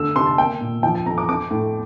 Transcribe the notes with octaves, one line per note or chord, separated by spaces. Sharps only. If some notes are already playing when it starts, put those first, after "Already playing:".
Already playing: D3 A3 E6
C3 C6
A5
A#3 G5
A#2
F3 G5
A5
F2 A#5
D6
C4 D6
A2